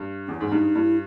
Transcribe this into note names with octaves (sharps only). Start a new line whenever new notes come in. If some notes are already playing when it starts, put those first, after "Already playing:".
Already playing: G2
E2 C#4
G#2
G2 D#4
G2 E4